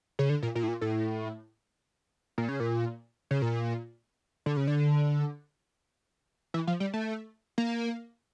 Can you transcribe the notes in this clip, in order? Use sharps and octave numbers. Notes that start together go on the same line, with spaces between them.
C#3
D3
A#2
A#2
A2
A#2
A2
A#2
C#3
A#2
C#3
A#2
D3
C#3
D3
E3
F3
G3
A3
A#3